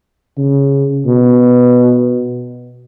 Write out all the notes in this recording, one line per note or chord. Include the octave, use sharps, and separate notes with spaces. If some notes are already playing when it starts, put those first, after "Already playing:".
C#3
B2